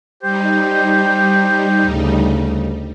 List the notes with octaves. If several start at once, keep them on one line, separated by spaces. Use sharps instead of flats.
G3 D#4 G4 C5
D2 C#3